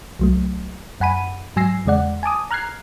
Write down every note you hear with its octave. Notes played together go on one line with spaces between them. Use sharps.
C2 F#3 A3
F#2 F#5 G#5 B5 D#7
G#2 F#3 G#5 E6 A#6 C7
E2 C#3 G#3 D5 F#5
G#5 A5 D6 D#6
A#5 F6 F#6 G#6 C7